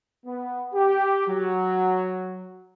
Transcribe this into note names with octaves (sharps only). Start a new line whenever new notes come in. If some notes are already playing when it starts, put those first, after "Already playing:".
B3
G4
F#3